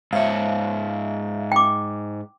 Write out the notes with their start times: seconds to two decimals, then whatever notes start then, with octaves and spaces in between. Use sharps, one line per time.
0.13 G#2 C#5 E5 F5
1.52 G5 D6